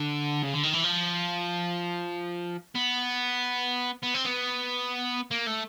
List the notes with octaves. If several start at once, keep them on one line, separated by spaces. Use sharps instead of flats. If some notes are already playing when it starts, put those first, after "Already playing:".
Already playing: D3
C#3
D3
D#3
E3
F3
B3
B3
C4
B3
A#3
A3